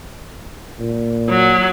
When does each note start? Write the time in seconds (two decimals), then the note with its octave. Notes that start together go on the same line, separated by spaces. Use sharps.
0.80 A#2
1.29 F#3